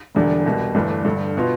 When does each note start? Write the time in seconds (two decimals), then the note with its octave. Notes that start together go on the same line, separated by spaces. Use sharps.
0.15 E1 E2 D3 G3 D4
0.46 C2 B2 G3
0.75 G1 G2 E3 A3 D4
1.04 G1 G2 D3
1.37 B2 B3 F4